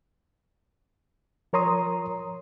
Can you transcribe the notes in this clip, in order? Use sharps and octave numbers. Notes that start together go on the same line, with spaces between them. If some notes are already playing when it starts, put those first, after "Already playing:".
F3 A#4 C#5 A#5 C6 D#6